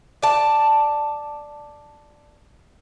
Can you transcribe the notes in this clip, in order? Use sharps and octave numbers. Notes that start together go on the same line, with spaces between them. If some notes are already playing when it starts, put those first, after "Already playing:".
D5 A5